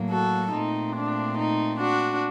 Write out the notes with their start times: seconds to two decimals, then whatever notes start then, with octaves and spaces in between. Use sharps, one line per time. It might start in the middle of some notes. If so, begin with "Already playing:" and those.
Already playing: A2 F#3 A#3
0.11 F#4 A4
0.53 A#2 A3 C4 D#4
0.96 D4
1.38 D#4
1.81 D4 F#4